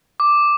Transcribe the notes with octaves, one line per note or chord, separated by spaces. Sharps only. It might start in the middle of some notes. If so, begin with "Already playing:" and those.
D6